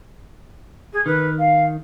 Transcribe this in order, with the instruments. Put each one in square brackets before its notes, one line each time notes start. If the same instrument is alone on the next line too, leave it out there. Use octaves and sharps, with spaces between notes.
[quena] G#4
[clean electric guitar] D#3 [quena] B4
[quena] F5